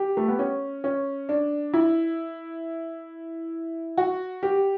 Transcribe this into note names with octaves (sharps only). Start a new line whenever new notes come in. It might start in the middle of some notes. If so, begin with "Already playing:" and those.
Already playing: G4
A3
B3
C#4
C#4
D4
E4
F#4
G4